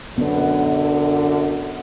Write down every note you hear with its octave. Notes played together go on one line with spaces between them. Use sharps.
F#2 D3 B3